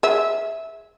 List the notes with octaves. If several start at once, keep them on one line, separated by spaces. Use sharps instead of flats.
G#4 E5